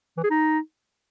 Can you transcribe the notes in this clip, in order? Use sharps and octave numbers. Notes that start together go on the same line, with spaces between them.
E3
G#4
D#4